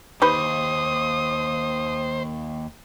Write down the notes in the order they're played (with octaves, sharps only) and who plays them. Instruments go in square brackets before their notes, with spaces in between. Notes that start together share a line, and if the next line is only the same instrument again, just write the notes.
[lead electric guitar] D#2 [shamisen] D#4 G4 B4 [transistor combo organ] C5 [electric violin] D#6